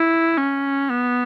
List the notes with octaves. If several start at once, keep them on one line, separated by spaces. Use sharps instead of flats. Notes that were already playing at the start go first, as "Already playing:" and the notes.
Already playing: E4
C#4
B3